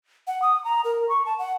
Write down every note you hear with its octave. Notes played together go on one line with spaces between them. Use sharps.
F#5
D#6
A#5
A#4
C#6
A5
F#5